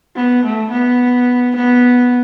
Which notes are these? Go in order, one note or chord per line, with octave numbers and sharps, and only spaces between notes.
B3
A3
B3
B3